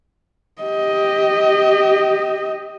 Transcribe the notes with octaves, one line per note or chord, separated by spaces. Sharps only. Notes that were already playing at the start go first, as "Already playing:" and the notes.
G4 D#5